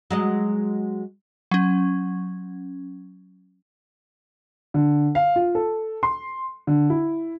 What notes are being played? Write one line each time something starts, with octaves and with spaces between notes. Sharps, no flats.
F#3 G#3 D#5
F#3 C#4
D3
F5
F4
A4
C6
D3
E4